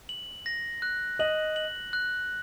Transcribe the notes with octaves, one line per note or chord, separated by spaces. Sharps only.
F#7
A#6
F#6
D#5 F#7
F#7
F#6